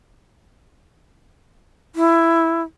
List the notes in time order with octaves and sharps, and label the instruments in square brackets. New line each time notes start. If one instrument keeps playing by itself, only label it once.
[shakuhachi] E4